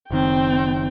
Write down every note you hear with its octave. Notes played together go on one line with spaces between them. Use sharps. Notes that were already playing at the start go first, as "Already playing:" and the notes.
F#1 D#3 C4 G5